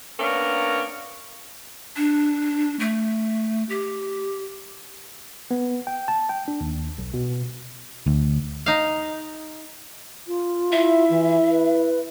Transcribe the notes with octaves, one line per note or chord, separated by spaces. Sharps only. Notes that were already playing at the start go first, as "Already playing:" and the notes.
A#3 B3 C#4 D4 A#4
D4
A3
G4
B3
G5
A5
G5
D4
D#2
B1
B2
D2
D#4 F5
F4
E4 E5
E3
B4